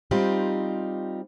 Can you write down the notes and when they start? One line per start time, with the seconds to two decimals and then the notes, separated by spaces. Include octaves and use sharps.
0.11 G3 C4 D#4 F4 G4